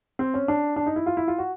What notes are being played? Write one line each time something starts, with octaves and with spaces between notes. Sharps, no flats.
C4
C#4
D4
D4
D#4
E4
F4
E4
F4
F#4